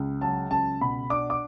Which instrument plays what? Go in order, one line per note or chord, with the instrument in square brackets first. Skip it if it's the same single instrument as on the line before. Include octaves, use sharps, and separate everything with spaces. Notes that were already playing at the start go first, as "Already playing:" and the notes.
Already playing: [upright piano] C#2
[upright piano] F#3 [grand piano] A5
[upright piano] C#2 [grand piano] A5
[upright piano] B2 [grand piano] B5
[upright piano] D4 [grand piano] D6
[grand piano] D6